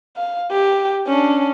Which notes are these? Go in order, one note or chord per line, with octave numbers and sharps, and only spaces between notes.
F5
G4
C#4 D4